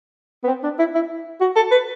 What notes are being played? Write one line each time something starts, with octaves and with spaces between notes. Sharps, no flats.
B3
C4
D4
E4
E4
F#4
A4
B4